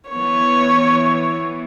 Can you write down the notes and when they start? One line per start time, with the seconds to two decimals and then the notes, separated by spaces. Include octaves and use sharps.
0.10 E3 B3 C#5